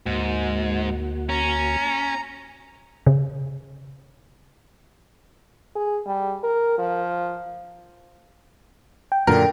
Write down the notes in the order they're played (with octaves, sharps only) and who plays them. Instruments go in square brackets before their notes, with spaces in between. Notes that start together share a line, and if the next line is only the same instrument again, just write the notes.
[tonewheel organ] D2 A#3 F#4 [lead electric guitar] G#2
[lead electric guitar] C#4 [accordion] A#5
[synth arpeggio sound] C#3
[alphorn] G#4
G3
A#4
F3
[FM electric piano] G5
[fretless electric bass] F#2 A#2 D3 [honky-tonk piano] A#4